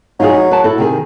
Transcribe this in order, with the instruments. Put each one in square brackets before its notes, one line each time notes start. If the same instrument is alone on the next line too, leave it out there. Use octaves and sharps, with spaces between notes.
[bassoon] F#3 [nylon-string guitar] D#4 F4 G#4
[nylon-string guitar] D#4
B4 A5
E4 F#4 A4
C3 D#3 G#4